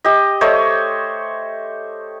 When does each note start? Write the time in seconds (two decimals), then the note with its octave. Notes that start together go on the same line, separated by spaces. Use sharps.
0.04 G4 D#5
0.41 A3 C5 C#5 D#5